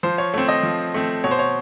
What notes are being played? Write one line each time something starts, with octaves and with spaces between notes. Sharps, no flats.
F3 C5
C#5
A3 C4 C#5
D#5
F3
A3 C4
B2 C#5
C5
C#5